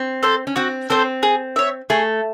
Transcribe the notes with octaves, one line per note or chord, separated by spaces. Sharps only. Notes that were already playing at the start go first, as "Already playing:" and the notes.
Already playing: C4
A4 C5
C#4
C4 F#4
C4 A4 C5
G#4
C#5 E5
A3 G#4